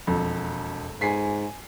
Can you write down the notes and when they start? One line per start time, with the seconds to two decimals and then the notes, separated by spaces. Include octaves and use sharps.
0.07 E1 F2
1.01 G#2 G#5 B6 C7